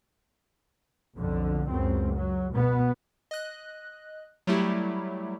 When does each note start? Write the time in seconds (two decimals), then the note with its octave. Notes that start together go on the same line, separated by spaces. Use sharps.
1.18 B1 F2 D3
1.71 C#2 F#2 C4
2.16 F#3
2.53 B2 B3
3.31 D#5 F#6
4.47 F#3 G3 A3 E4 G4